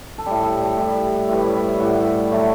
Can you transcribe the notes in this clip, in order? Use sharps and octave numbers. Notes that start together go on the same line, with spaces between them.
A4
A2 G3 G4
A4
D5
A2 G3 E5
A2 G3 B4
C#5
D5
E5
A2 G3 F#5
A2 F#3 A3